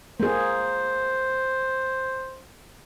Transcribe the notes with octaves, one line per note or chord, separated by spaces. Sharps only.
A#3 G#4 C5